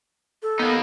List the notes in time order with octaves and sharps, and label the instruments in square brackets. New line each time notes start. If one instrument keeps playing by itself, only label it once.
[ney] A4
[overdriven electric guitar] A#3 D#4 [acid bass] B3